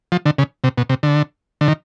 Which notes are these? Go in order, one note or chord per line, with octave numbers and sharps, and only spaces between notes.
F3
D3
C#3
C3
B2
C3
D3
D3
D#3